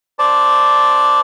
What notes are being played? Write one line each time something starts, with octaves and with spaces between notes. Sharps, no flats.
C5 D5 A5